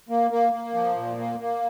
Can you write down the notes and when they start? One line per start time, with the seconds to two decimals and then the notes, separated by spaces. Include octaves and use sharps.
0.09 A#3
0.31 A#3
0.53 A#3
0.74 F3
0.96 A#2
1.18 A#3
1.40 A#3